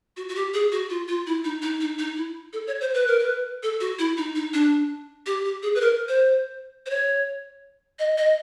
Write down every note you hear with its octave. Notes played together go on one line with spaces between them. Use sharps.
F#4
F#4
G4
G#4
F#4
F4
F4
E4
D#4
D#4
D#4
D#4
E4
A4
C#5
C5
B4
A#4
B4
A4
F#4
E4
D#4
D#4
D4
G4
G4
G#4
B4
A#4
C5
C5
C#5
D#5
D#5